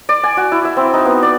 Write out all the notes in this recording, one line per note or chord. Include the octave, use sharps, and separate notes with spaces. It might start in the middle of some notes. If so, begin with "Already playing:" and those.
D5
G#5
F#4
E4
E5
C4
D#4
B3
D5